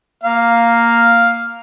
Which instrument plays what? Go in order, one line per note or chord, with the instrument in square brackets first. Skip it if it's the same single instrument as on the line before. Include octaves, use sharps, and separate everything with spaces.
[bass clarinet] A#3 [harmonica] F5